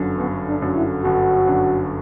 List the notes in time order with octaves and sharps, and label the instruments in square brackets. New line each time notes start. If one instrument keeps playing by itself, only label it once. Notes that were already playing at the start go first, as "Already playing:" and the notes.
Already playing: [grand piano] G1 F#2 D3 F#3
[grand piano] G1 [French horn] B3
[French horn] D4
[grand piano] F#2 D3 F#3
[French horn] E4
[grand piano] G1 [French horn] F#4
[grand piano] F#2 D3 F#3